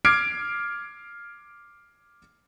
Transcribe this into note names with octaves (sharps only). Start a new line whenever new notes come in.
D6 F6 G#6 C7 D7